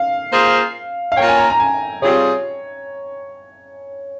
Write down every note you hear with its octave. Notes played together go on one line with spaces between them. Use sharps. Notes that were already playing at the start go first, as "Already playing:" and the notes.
Already playing: F5
A#3 F4 G#4 C5
F5
A#3 F4 A#4 C#5 G5
G#5
A#5
A#5
G#5
C3 G3 C4 F4 G#4 C#5